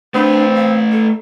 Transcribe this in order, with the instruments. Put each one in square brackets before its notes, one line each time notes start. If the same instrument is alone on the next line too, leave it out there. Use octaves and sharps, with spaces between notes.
[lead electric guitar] A3 B4 [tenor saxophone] C4 [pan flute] D4
[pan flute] F5
A4